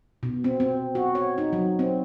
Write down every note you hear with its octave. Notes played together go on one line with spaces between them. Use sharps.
B2
C4
C4
F#4
C#5
D#4
F#3
C4